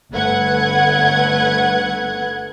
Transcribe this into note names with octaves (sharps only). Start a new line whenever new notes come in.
G1 A3 B4 F#5 F#6 G#6